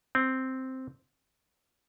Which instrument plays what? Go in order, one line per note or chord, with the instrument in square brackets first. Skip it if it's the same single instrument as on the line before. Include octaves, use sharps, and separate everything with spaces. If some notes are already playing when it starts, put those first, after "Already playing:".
[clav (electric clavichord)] C4